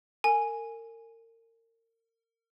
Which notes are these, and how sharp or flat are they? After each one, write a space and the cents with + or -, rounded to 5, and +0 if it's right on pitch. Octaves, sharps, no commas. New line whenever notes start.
A#4 -35 G#5 +0